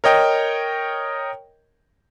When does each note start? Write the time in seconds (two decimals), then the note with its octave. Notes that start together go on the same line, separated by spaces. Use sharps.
0.04 A#4 C#5 D#5 G5